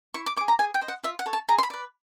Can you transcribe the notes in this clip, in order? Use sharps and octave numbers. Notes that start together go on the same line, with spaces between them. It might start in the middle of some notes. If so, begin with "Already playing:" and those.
E4 C#6
D6
C#5 D6
G#4
A#5
G#4 G#5
G5
C5 D#5
F#5
F4 E5
F#5
A4 C#5
A5
G#4 A#5
C6
B5
B4 D5